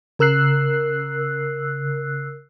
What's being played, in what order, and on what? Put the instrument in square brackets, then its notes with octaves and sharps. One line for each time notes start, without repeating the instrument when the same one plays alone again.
[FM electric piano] C#3 A#4 E6 F#6 C7